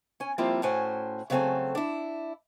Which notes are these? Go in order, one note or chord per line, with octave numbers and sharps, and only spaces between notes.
C#4 G#5
F3 G3 A#3 C4 E4 F4
A2 C#4 F#4 C5 G#5
C#3 F#3 A3 C4 A4 G#5
D4 E4